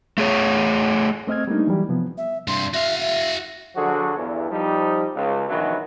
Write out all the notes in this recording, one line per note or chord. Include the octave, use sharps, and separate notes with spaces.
A3 G#4 C#5
A3 C4 D#5 F6 G#6
G3 A3 A#3 D4 D#4
E3 F#3 G3
C3 F3 B3
E5
G2 C3 C6
F#4 E5 F5
E5
D3 F3 F#3 F#4 G#4 A4
E2 G2
F3 G3 D#4
C#2
A#1 B2 D#3 E3 F#3 F#4